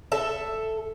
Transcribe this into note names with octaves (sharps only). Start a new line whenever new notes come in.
A4 E5